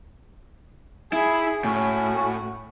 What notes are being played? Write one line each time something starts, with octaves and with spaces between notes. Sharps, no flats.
E4 G#4
A2 C#4 F#4